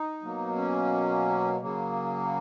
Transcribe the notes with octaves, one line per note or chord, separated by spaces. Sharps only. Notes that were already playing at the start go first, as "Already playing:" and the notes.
Already playing: D#4
B2 F#3 A#3
C#4
C#3 F#3 A#3